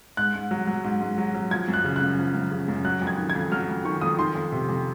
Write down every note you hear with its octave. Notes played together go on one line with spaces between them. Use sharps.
G#2 F#6
G#2
F#3
F#3
G#2
G#2
F#3
F#3
F3 G#6
F#2
F#6
C#3
F#6
F#2
F3
F#2
C#3
F#2
F#3 F#6
F2
G#6
D#3
G#6
F2
F#3 F6
F2
D#3 C#6
F2 D#6
D#3 C6
F2
C3
F2